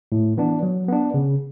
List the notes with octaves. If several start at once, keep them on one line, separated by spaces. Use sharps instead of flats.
A2
E3 B3 D4
F#3
B3 D4
C#3